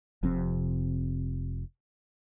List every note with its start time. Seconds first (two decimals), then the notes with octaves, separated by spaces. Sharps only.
0.23 F1 F2 C3 C4